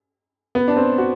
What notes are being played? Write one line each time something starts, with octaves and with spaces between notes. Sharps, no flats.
B3
D4
C4
F#4